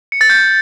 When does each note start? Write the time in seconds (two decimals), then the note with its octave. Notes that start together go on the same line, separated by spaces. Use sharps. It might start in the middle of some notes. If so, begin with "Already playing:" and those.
0.12 C#7
0.21 A6
0.30 G6